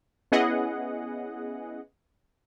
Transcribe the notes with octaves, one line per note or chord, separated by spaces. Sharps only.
B3 C#4 E4 G#4 D#5 F#5